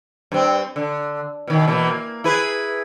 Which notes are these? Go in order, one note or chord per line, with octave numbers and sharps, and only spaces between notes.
G2 C4
D3
B2 D#3
B2 E3 A#3
A#3
E4 G#4 B4